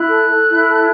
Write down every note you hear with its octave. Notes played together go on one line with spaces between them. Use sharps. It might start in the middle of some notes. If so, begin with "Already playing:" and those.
Already playing: E4 F#6
A4
A4
E4
A4